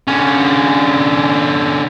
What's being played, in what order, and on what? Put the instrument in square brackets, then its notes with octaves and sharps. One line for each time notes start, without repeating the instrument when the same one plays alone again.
[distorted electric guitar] D3 C#4